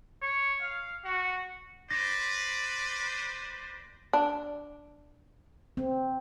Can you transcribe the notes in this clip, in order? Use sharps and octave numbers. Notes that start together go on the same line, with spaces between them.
C#5
F5
F#4
B4 C5 D5 A#6
D4
C4